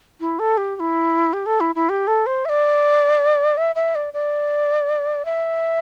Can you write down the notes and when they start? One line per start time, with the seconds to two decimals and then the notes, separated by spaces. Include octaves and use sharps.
0.20 E4
0.39 A4
0.57 G4
0.76 G4
0.80 E4
1.33 G4
1.46 A4
1.60 E4
1.75 E4
1.89 G4
2.07 A4
2.26 C5
2.45 E5
2.49 D5
3.57 E5
3.76 E5
3.95 D5
4.13 D5
5.25 E5